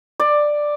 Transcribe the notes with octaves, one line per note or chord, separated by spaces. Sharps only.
D5